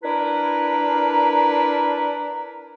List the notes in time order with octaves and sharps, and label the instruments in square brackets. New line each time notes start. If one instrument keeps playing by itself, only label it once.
[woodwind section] D4 E4 A#4 B4 A#5